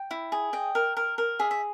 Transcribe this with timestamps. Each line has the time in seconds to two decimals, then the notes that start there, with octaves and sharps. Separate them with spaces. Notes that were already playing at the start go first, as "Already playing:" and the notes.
Already playing: G5
0.11 E4
0.32 G#4
0.53 D#5 G5
0.75 A#4
0.97 A#4
1.18 A#4
1.39 G#4 E5
1.51 E5